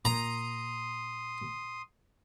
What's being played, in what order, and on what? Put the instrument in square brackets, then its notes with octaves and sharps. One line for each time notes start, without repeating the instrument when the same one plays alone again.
[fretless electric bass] A#2 [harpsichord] A#5 [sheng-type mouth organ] C6 D#6